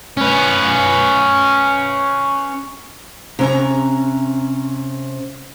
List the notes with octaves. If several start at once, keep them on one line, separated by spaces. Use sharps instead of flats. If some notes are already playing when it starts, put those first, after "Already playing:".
C#4 B4
C3 C#4 A#5